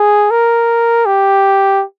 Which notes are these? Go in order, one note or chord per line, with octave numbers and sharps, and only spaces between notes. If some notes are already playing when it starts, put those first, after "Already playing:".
Already playing: G#4
A#4
G4